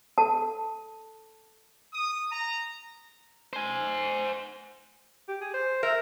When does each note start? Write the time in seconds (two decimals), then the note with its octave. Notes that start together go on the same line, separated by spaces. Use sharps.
0.18 A4 A5
1.93 D#6
2.31 A#5
3.53 C5 G#5
5.28 G4
5.41 G#4
5.54 C5
5.83 A#4 E5